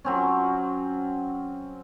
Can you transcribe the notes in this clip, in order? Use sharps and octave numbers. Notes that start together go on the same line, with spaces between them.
F#3 C4 C#4